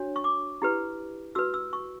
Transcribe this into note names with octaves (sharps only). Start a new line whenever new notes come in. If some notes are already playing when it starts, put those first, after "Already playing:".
Already playing: D4 F#4 C#5
C#6
D6
E4 G4 B4
F#4 B4 E6
E6
C#6